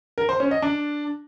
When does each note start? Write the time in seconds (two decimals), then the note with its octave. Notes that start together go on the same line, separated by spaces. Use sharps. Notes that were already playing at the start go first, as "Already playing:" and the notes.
0.18 A#4
0.29 C5
0.40 C#4
0.51 D#5
0.62 D4